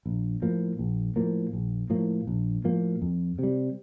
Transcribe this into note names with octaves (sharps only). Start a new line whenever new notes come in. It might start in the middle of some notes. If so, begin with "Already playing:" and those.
A#1
A2 F3 A#3
A#1
A2 F3 A#3
A#1
A2 F3 A#3
A#1
A2 F3 A#3
F2
C3 G3